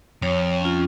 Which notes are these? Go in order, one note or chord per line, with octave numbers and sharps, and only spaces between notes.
F2 C#5
C#4 F4